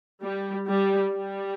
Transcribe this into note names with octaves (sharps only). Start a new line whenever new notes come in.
G3
G3
G3